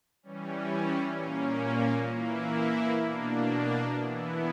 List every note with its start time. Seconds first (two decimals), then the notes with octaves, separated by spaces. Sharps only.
0.23 E3 G3 C#4
1.16 A#2 A#3 C#4
2.12 E3 A#3 E4
3.05 B2 A#3 D4
4.00 E3 B3 E4